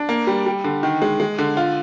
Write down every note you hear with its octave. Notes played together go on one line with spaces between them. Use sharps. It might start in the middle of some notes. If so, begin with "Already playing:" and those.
Already playing: D4
A#3
G3
G3
D3
D#3
G#3
G#3
D3
F4